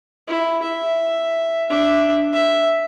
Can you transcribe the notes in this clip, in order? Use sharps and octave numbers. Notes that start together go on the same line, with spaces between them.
E4
E5
D4 E5
E5